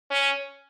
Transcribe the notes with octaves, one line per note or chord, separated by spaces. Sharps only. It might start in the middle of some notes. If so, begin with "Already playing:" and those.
C#4